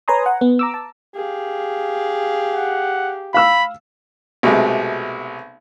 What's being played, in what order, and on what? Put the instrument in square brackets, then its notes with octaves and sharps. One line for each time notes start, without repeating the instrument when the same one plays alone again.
[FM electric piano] B4 C#5 G#5 A#5 C6 D#6
F#5
B3
A#5 D6 E6
A5
[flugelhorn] G4 [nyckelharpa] G#4 F5
[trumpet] F#5
[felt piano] F5 E6 [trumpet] B5
[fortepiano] B1 C3 G#3 A3